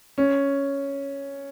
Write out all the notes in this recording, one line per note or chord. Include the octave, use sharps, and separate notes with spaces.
C#4